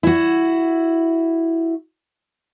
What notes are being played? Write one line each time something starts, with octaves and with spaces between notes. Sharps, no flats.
E4 F#4